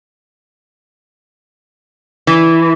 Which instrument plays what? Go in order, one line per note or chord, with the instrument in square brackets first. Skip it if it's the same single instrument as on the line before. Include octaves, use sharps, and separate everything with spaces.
[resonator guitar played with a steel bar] E3